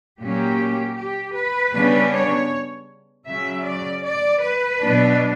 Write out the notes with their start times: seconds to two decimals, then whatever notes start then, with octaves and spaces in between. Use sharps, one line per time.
0.20 A#2 F#3 A#3 C#4 G4
0.96 G4
1.35 B4
1.73 C#3 G3 B3 D4
2.12 C#5
3.27 C#3 F#3 C#4 E5
3.66 D5
4.03 D5
4.42 B4
4.81 B2 F#3 B3 D4